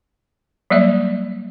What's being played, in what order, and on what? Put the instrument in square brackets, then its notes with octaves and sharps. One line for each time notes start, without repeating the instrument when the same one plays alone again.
[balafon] F#3 G3 A#3 D5 E5